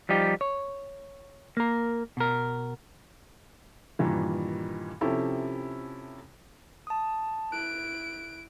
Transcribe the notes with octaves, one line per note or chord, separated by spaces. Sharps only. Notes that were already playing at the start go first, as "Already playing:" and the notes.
F3 G3 D#4 G4
C#5
A#3 A#4
B2 A#4
G2 A#2 D#3 E3
C3 F3 C#4 E4 G4 A4
A5 D#6
E4 F#6 D7